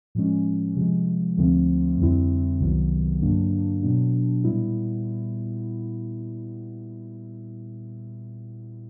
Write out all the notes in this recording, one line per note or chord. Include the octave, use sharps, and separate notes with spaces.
A2 F3 G#3 C#4
C3 F3 G#3
D2 D3 F3 A3 C4
F2 D3 G3 C4 E4
C2 C3 D#3 F#3 B3
G2 D3 F#3 A#3 D4
B2 F#3 B3 D4
A#2 G3 B3 E4